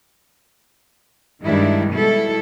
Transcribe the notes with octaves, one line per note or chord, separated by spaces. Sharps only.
G2 D#3 G3 G#3 D4 E4
B2 G3 G#3 E4 A4